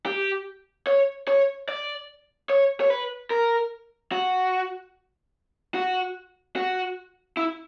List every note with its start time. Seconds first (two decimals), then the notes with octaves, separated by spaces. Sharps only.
0.06 G4
0.87 C#5
1.28 C#5
1.69 D5
2.50 C#5
2.80 C#5
2.90 B4
3.30 A#4
4.12 F#4
5.74 F#4
6.56 F#4
7.37 E4